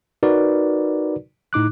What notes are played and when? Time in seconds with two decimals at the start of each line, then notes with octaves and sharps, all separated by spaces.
0.23 D#4 F#4 A#4 B4 D5
1.53 A2 D#4 D6 F#6